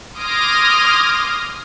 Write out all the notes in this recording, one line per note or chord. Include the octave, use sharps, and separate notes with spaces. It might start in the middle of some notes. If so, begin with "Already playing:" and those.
C6 D6 D#6 F6 G#6 A#6